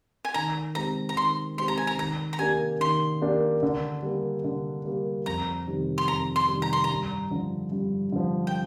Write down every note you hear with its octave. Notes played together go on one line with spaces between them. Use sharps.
G#5
D#3 A#5
G#3 C4 G4 A#5
A#5
D#3 C6
G#3 C4 G4 C6
A#5
G#5
A#5
D#3 A#5
A#5
A#3 D4 G4 G#5
D#3 C6
A#3 D4 G4
D3
G3 A#3
D3
G3 A#3
F2 A#5
C3 D#3 G3
C6
F2 A#5
C6
C3 D#3 G3
A#5
C6
A#5
G2
D3 F3
G2
D3 F3
G5